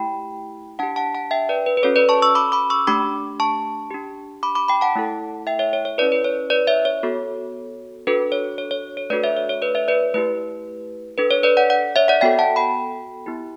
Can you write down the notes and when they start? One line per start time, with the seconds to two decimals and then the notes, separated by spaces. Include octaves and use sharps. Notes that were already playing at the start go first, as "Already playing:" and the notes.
Already playing: A3 E4 G4 G5 B5
0.79 D4 G4 F#5 A5
0.96 F#5 A5
1.15 F#5 A5
1.31 E5 G5
1.49 B4 D5
1.66 B4
1.77 B4
1.83 C#4 F#4 A4 C#5
1.96 B4 D5
2.09 A5 C#6
2.22 C#6 E6
2.35 B5 D6
2.52 B5 D6
2.70 C#6 E6
2.87 A3 D4 G4 B5 D6
3.40 A5 C#6
3.91 D4 G4
4.43 B5 D6
4.55 B5 D6
4.68 G5 B5
4.81 F#5 A5
4.95 A3 E4 A4
5.47 E5 G5
5.59 C#5 E5
5.73 C#5
5.85 C#5
5.98 C#4 E4 A4 B4 D5
6.12 B4
6.24 C#5
6.50 B4 D5
6.67 C#5 E5
6.85 C#5
7.03 B3 F#4 A4
8.07 D4 F#4 A4 B4
8.32 C#5
8.58 C#5
8.71 C#5
8.97 C#5
9.10 A3 D4 F#4 A4 B4 D5
9.24 C#5 E5
9.37 C#5
9.49 C#5
9.62 B4 D5
9.75 C#5 E5
9.88 B4 D5
10.14 A3 E4 G4 B4
11.18 D4 A4 B4
11.31 C#5
11.43 B4 D5
11.57 D5 F#5
11.70 D5 F#5
11.96 C#5 E5
12.08 D5 F#5
12.21 B3 F#4 A4 E5 G5
12.39 F#5 A5
12.56 G5 B5
13.26 B3 E4 G4